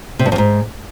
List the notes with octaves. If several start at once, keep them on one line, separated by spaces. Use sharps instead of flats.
C3
G2
F2
G#2